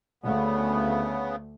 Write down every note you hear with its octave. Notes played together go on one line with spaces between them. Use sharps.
D2 C#3 A3 B3